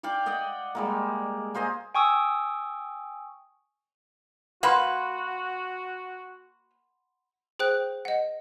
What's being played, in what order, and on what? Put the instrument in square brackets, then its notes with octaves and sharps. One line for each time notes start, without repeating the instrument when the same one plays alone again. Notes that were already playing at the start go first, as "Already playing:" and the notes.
[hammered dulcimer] D5 F5 G5 D6
D5 D#5 F#5 G5
G3 G#3 A#3
A#3 C5 D#5 G#5
[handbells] G5 G#5 C#6 D#6 E6
[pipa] A#3 B4 [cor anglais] F#4 [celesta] F#5 B5 C6
[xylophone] G#4 C5 G5 F#6
D#5 F#5